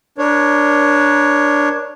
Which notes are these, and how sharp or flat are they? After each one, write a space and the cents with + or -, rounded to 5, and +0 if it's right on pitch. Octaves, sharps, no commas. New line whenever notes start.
D4 +0 A#4 +25 C#5 +0